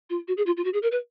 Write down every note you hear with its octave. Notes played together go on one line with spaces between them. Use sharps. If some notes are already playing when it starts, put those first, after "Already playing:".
F4
F#4
G#4
F4
F4
F#4
G#4
A#4
B4